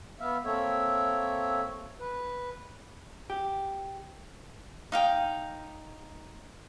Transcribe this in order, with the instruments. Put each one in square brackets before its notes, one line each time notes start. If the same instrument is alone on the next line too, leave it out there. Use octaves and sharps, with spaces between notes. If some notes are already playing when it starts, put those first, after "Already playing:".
[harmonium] B3 E5 F5
A#3 C4 A4 C#5 E5
B4
[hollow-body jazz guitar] G4
[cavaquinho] D#4 F5 G5